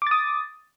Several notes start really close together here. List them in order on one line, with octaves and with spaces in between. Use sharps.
D6 A6 D#6